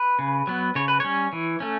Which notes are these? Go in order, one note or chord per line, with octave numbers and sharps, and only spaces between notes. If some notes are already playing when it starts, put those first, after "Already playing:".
Already playing: B4
C#3
F#3 B3
C#3 C#5
B4
G3 C#4 C#5
E3
A3 C#4